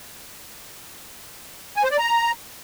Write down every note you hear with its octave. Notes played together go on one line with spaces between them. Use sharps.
G#5
C5
D5
A#5